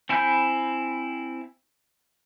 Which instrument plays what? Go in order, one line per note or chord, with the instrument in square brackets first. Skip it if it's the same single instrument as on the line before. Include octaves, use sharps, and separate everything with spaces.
[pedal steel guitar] C4 E4 G#5 B5 G6